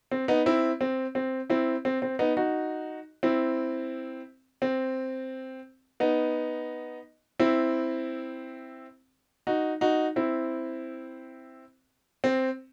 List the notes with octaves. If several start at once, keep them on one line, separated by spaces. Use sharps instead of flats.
C4
B3 D#4
C4 E4
C4
C4
C4 E4
C4
C4
B3 D#4
D#4 F#4
C4 E4
C4
B3 D#4
C4 E4
D#4 F#4
D#4 F#4
C4 E4
C4